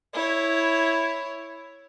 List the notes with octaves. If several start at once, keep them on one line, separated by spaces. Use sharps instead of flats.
E4 C#5